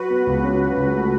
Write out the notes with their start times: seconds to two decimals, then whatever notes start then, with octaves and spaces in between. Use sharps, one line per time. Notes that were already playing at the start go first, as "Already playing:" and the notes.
Already playing: F#3 F#4 B4
0.10 B3
0.27 C#2
0.44 C#4
0.61 F#3
0.77 C#2
0.93 A3